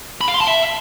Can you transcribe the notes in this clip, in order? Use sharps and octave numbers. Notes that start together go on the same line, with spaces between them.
B5
F5
C6
A5
E5